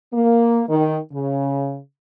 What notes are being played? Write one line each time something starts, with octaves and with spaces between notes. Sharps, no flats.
A#3
D#3
C#3